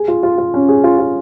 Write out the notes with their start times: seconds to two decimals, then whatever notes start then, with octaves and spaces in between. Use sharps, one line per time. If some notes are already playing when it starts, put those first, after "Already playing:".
Already playing: G#4
0.08 F4
0.23 F4
0.38 F4
0.54 C#4
0.69 G#4
0.84 F4
0.99 F4